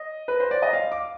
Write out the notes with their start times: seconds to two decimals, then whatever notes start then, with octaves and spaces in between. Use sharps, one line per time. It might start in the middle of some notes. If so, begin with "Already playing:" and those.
Already playing: D#5
0.28 B4
0.40 C5
0.51 D5
0.62 D#5
0.73 F5
0.92 D6